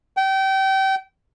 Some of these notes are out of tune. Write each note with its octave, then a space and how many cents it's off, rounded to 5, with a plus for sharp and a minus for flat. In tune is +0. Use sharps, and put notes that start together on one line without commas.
G5 -30